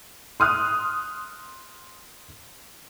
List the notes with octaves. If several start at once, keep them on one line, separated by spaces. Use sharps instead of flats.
C6 D#6 F6 F#6